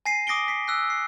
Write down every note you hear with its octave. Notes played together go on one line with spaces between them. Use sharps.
G#5 A#6 C7 D#7
D6 D#6 A#6 C7 D7 G7
B6 C7
E6 F#6 B6
C7